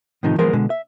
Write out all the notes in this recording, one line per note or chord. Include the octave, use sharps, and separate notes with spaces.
A2 C3 D#3 F3 D#4
E3 F3 G#3 B3 A#4 C5
B2 D3 G#3
E5